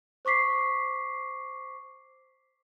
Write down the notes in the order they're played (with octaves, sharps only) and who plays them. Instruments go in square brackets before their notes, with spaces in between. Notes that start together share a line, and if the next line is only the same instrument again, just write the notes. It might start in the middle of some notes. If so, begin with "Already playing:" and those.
[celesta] C5 C#6 D6 B6 C7